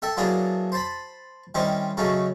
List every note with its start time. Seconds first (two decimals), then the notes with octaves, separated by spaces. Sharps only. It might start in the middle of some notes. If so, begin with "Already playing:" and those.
0.02 A4 E5 G5
0.17 F#3 A#3 B3 D4 E4 G#4
0.72 C5 A5 B5
1.55 D#3 G3 C4 C#4 D#4 E4
1.97 C#3 F#3 A3 C#4 D#4